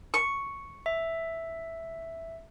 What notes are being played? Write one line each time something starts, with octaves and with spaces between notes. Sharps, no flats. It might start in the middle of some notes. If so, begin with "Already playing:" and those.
C#6
E5